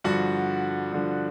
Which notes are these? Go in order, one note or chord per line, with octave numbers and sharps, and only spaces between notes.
G2 D3 F3 F#4 F#5
G2 D3 F3